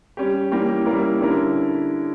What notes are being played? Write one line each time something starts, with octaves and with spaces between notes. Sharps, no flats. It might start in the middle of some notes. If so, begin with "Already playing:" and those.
G3 C#4 G4
E3 G3 A#3 C#4 G4
G3 A#3 C#4 E4 A#4
D3 G3 C#4 E4 A#4